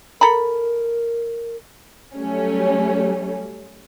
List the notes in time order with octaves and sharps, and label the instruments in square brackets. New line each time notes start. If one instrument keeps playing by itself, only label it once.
[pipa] A4 A#5 B5 [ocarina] A#4
[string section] F#3 G3 A3 C#4